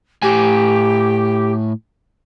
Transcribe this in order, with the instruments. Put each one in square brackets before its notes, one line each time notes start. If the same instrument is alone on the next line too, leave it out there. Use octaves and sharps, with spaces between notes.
[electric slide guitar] A2 G#5 [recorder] G4